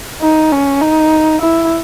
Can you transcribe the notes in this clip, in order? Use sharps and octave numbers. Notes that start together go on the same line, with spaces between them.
D#4
C#4
D#4
E4